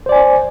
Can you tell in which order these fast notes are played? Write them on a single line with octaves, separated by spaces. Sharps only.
C5 D5 G#5